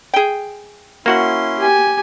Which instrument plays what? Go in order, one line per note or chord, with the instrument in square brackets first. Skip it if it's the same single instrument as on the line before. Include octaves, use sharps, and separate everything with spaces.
[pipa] G#4 G5
[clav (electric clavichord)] A#3 F#4 F#5 [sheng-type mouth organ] C#4 E4 C6
[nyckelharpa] G4 G#5